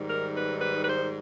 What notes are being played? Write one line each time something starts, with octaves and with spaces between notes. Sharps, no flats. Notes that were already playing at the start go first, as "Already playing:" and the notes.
Already playing: G#2 D#3 G3
A#4
B4
B4
B4
C5